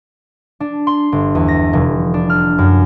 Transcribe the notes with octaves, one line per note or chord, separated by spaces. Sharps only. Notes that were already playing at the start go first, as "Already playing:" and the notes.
D4
C6
G1
E2
A#6
F1
D4
F6
F#2